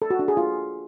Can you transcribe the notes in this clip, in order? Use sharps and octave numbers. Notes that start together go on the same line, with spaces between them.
A4
F#4
D4
G#4
F4